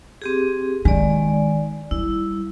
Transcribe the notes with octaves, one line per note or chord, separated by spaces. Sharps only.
C4 G4 G#4
D#3 G#3 D5
G3 E4